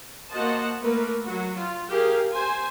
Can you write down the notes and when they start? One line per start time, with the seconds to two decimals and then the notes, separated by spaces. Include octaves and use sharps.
0.32 A#3 F#4 C5 D#5 F#5 A5
0.82 A3 A#3 A#4 B4
1.27 F#3 F#4
1.59 F4
1.91 G4 G#4 A#4 F5
2.32 C5 G#5